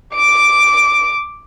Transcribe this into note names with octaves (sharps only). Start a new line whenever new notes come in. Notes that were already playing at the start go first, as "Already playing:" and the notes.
D6 D7